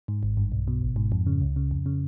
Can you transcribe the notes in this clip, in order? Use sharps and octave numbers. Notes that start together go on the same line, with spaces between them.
G#2
G#1
G2
B1
B2
G#1
G#2
F2
C#3
C#2
C#3
F2
C#3